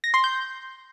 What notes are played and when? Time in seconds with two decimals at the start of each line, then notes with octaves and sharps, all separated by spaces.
0.04 A#6
0.14 C6
0.24 G6